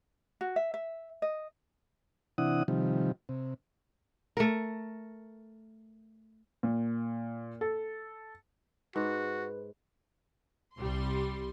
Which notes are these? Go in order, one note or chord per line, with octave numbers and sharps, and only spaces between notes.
F#4
E5
E5
D#5
C3 E3 D4 E4 F#5 D#6
C3 D#3 F3 G3
C3
A3 A#4
A#2
A4
G#2 F#4 B4
C2 G3 C6